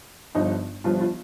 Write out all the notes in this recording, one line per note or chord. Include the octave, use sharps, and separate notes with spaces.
G1 G2 F3 D#4
G1 G2 F3 F4
F4